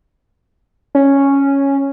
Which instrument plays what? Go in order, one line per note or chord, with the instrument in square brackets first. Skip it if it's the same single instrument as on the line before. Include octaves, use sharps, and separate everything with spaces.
[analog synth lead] C#4